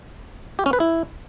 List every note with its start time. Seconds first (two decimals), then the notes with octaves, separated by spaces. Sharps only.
0.59 G4
0.66 C#4
0.73 B4
0.80 E4